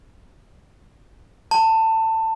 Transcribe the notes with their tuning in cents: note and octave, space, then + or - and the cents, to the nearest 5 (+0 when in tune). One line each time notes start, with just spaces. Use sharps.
A5 +20